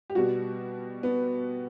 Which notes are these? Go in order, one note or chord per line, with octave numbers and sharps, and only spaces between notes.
G4
B2 G3 F#4
B3